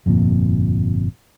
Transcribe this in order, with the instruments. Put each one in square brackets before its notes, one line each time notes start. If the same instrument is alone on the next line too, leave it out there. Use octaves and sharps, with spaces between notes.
[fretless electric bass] G1 F2 A#2